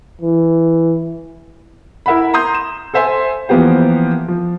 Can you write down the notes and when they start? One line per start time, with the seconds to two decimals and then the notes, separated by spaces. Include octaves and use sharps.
0.21 E3
2.06 E4 A#4 E5 F#5 B5
2.34 A#5 C6 D#6 G6
2.55 E7
2.94 A4 C5 E5 G#5 C6
3.49 E3 F3 A#3 B3 G4 C5
4.28 F3